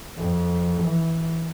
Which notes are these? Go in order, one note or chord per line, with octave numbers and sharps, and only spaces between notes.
F2
E3